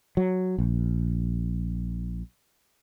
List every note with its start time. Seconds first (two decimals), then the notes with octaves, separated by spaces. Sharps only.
0.17 F#3
0.58 A#1